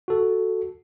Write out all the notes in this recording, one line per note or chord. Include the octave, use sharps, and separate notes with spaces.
F#4 A4